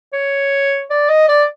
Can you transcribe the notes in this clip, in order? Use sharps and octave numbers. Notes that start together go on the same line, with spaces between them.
C#5
D5
D#5
D5